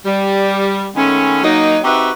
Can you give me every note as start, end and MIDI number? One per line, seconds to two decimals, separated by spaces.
0.06 0.87 55
0.96 1.43 51
0.96 1.43 56
0.96 1.43 57
0.96 1.43 59
0.96 1.43 61
1.43 1.79 54
1.43 1.79 58
1.43 1.79 63
1.84 2.11 60
1.84 2.11 63
1.84 2.11 66
1.84 2.11 67
1.84 2.11 71
1.84 2.11 76